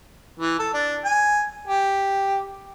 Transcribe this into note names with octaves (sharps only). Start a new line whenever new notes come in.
E3
A4
D4
G#5
G4